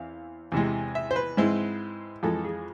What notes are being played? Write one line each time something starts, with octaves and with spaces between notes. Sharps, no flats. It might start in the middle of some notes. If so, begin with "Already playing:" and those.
Already playing: E2 C4 E4 F5
E2 C3 E3 G#3
E5
C5
B4
G#2 G#3 C4 E4
F2 E3 G#3 A4
G#4